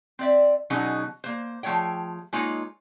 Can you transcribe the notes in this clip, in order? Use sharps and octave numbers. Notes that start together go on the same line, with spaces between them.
C4 D5 E5
B2 D3 F#3 C#4 D#4 G#4
A#3 C5
F3 A3 G#4 C#5 G5
G#3 A#3 D#4 F4 C#5